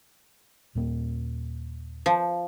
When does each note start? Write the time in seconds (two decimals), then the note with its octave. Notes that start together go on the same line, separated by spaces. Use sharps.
0.75 D#2 A#2 A#3
2.06 F3